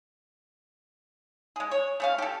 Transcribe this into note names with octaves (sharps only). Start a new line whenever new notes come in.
G#3 G#4
C#5
A3 C#4 F5
G4 A4